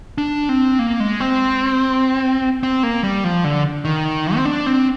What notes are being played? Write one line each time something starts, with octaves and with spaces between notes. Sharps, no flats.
D4
C4
A#3
G#3
C4
C4
A#3
G3
F3
D3
D#3
C4
D4
C4